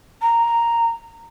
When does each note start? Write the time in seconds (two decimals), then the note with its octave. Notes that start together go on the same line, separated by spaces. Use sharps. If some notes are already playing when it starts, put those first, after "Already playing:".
0.22 A#5